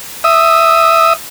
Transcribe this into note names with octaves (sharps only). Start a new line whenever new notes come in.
E5 D#6